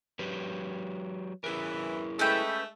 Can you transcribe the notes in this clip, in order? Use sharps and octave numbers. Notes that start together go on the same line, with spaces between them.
F#3 G4 B4
E3 E4 G#4 A#4
G#3 A3 C#4 B4 G5